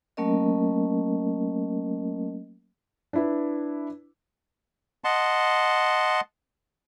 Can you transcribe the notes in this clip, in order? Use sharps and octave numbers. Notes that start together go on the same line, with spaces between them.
F#3 A3 A#3 C#4 A#4 D#5
D4 E4 B4
D#5 F#5 A5 C6